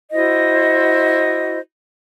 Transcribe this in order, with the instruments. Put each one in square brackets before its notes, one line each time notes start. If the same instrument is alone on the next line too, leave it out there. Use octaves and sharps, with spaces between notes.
[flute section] E4 F#4 C5 D#5